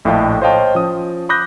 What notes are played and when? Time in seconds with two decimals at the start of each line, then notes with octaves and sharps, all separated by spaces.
0.05 A#1 A2 D#5 F5 G5 A5
0.41 C5 C#5 D#5 F5 G5 A5
0.75 F3 C#4 D#6
1.29 B5 D6 D#6 F#6 G6 A#6